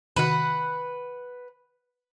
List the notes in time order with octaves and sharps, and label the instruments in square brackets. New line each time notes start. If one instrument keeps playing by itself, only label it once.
[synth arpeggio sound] C3 D#3 F#4 [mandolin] B4 F#5